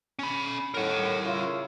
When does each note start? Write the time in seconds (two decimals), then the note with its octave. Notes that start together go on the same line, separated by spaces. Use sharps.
0.19 C#4 B5
0.74 D#2 A2 A#4 F#5
1.26 C#3 E4 F4